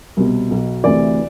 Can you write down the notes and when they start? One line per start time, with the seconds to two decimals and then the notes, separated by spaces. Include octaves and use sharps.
0.17 C2 B2
0.50 B1 B2
0.84 D2 C3 E3 D5